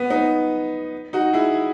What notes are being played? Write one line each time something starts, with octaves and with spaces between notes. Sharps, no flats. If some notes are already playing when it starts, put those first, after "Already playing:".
Already playing: B3
B3 D#4
D#4 F#4
E4 G#4